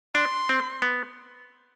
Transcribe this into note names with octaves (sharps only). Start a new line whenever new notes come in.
D4 C6
C4
B3